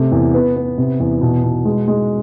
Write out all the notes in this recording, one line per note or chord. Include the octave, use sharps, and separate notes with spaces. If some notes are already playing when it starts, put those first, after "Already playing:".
Already playing: C3 A3
E2
B3
B3
C3
E2
B2
B2
G#3
G#3